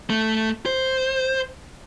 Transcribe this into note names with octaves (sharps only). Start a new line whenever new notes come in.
A3
C5